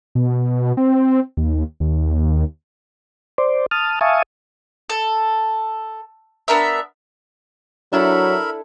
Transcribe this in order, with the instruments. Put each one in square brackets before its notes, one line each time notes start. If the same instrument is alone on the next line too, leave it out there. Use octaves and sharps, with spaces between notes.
[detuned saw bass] B2
C4
D#2
D#2
[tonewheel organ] C5 D5
A5 D#6 F6
E5 F5 G#5 A5 C#6 D#6
[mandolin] A4
B3 D4 A#4 E5
[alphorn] F#3 [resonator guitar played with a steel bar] D4 E4 A4 [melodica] A#4 E5 B5